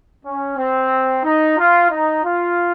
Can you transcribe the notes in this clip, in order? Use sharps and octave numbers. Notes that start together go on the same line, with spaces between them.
C#4
C4
D#4
F4
D#4
F4